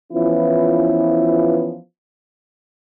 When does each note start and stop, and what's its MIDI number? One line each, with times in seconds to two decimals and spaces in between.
0.13 1.76 52
0.13 1.76 53
0.13 1.76 59
0.13 1.76 61
0.13 1.76 64
0.13 1.76 65